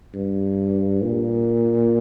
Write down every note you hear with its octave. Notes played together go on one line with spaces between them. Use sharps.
G2
A#2